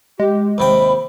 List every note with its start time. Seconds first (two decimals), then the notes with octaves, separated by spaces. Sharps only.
0.19 G#3 G4
0.58 D#2 C3 G5 B5